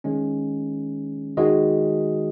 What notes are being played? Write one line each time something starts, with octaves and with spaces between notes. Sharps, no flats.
D#3 G#3 C#4
D#3 G#3 F#4 D#5